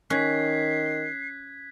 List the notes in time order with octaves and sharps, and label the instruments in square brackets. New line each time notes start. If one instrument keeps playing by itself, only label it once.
[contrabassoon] D#3 [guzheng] C#4 [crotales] F#6 G#6 B6 [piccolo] C7